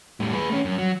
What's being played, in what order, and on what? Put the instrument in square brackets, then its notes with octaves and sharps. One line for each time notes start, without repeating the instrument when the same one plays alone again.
[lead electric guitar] A2 G3
G#4 B4
A3 C#4
F#2
F#3